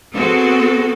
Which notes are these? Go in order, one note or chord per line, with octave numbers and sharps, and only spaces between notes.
B3 C4 F#4 G#4 A4